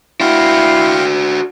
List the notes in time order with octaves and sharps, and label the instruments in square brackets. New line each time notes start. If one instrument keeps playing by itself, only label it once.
[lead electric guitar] D4 F#4 [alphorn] E4 [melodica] F5 G5 C6